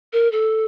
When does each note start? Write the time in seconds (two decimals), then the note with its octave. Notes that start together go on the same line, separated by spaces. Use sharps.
0.13 A#4
0.32 A4